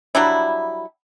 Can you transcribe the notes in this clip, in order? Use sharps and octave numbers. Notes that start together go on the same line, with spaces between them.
F#3 G3 D4 E4